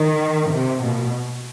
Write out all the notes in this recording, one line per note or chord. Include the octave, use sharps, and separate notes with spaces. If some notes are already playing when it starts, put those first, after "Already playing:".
Already playing: D#3
C3
B2